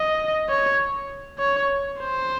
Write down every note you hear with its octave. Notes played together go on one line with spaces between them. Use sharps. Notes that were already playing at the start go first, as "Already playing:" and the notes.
Already playing: D#5
C#5
C#5
C5